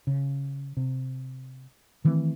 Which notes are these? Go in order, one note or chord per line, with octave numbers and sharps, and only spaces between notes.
C#3
C3
D#3 E3 A3 C4